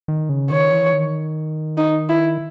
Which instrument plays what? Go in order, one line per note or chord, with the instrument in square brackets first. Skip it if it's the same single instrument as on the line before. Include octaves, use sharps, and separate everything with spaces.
[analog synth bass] D#3
C#3
[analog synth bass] D#3 [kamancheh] C#5
[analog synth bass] E3
D#3
[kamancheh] D#4
E4